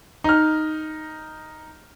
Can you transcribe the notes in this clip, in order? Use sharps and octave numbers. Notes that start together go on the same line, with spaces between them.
D#4 F6